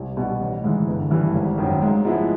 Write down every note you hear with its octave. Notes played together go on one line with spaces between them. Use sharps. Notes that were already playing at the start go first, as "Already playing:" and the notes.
Already playing: C2
B2 G3
A1
G#2 E3
G1
G2 E3 G3
G#1
F#2 D#3
G#2
F3 G#3 B3 E4